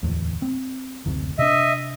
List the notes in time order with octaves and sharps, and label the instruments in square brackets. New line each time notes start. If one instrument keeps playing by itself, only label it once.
[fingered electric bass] D1 E2
C4
F#1 D2 C3
[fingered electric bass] C3 D4 [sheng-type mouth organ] D#5 E5